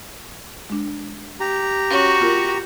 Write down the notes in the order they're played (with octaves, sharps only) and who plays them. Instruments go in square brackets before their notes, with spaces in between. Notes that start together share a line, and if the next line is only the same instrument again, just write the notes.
[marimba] G#3 D4
[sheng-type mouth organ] G4 A#5
[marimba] C#4 C#5 [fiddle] F#4
[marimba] B3 F4 A#4